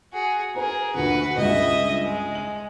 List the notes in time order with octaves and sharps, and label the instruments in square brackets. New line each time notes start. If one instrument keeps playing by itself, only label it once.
[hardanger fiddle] F#4 G#4
[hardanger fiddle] G#4 A#4 [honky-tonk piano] B4 A#5
[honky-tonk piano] D2 A#2 D3 [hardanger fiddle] F#4 B4
[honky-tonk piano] C#2 G2 [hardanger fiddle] D#5 E5
[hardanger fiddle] G#3
[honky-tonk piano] F#7